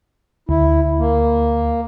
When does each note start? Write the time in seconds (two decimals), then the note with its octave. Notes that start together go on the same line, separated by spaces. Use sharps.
0.49 D2 E4
0.99 A#3